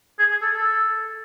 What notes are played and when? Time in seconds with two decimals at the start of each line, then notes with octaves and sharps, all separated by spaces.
0.19 G#4
0.31 G#4
0.42 A4
0.54 A4